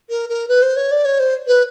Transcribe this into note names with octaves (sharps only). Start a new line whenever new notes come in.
A#4
A#4
B4
C5
C#5
D5
C#5
C5
B4